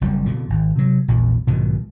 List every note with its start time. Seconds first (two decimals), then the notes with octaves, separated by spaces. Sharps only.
0.01 F#1 F2 G3
0.26 F2 B2 D3
0.50 G#1
0.76 C3 F#3
1.08 A#1 E2
1.47 B1 G#2 B2 D#3